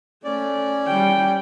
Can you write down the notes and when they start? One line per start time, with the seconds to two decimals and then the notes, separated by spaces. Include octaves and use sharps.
0.24 A3 C#4 D5
0.87 G3 G5